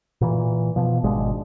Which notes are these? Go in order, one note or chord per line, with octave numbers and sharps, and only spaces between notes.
A#2 E3
B2 F3
G#1 B2 G#3 D4